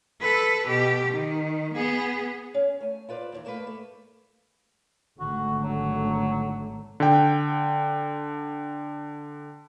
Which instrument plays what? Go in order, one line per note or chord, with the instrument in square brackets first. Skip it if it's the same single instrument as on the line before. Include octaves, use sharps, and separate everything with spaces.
[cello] A4 B4
B2 G4
D#3
B3 G#4
[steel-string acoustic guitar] C#4
A3 G#5
E4 F4 B4 C5 D5
D#2 C3 E3
G2 A3 A#3 G4 B4
A3
[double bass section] G#1 D3 A3 [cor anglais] F#4
[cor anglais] F#3
[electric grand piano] D3 G5